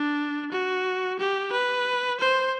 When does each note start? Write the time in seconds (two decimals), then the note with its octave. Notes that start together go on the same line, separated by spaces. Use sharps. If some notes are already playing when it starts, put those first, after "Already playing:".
Already playing: D4
0.51 F#4
1.19 G4
1.52 B4
2.20 C5